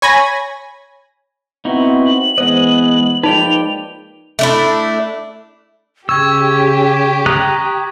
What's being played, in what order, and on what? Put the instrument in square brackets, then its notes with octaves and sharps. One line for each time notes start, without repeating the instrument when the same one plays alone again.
[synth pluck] C#5 G#5 B5 G#6 A#6
[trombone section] B3 C4 [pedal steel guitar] D#4 E4 F#4
[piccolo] F#7
[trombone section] E3 B3 [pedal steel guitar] G#3 D#5 [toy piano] C5
[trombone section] F3 G#3 A#3 [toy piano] D#4 [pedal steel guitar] B4 D5 G5 [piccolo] F7
[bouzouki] A3 D4 E4
[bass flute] C#3 [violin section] G4 [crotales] C#6 G#6 [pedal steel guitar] E6
[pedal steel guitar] A#5 D#6 F#6